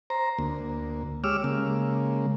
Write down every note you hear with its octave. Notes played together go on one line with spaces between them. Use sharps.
C5 A#5
D2 A#3
G#3 G4 C#5 D6 E6 F6
C#3 G#3 A#3